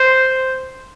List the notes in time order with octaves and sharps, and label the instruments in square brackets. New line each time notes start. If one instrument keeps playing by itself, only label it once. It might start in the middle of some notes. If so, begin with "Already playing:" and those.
Already playing: [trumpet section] C5